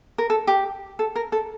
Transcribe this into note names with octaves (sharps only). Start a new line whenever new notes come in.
A#4
A4
G4
A4
A#4
A4